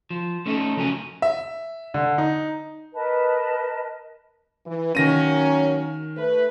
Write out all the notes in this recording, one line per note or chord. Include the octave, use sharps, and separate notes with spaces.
F3
A3 C#4 D#4 G#4 A4
C#3 F3 F#3 C#4 A#4 G#5
E5
D3
D#4
A#4 B4 D#5 A5
E3
D#3 F#3 A#3 C#4 A#6 D#7
A3 B4